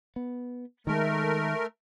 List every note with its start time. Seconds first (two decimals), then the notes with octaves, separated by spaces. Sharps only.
0.16 B3
0.87 D#3 G#3 A3 A#4